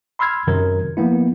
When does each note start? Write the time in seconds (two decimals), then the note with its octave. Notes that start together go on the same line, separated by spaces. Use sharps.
0.19 B5 C6 E6 F6 G#6
0.47 F#2 C3 D#3 F#3 A#4 G#6
0.97 F3 A#3 B3 E4